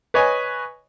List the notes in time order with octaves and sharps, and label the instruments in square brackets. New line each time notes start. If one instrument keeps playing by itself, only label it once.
[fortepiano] B4 C#5 D#5 G#5